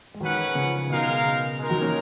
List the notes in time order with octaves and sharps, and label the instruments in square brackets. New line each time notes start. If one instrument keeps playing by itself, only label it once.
[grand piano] G#3
[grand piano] D#3 F#3 [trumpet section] C#4 G#4 B4 F#5
[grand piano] C#3 F3
[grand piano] B2 D#3 [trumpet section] G#3 D#4 A#4 F5
[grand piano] C#3
[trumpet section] G#3 D#4 A#4
[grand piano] D#3 F#3
A#3 C#4